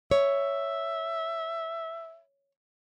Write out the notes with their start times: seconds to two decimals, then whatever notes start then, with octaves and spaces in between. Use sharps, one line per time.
0.11 C#5 E5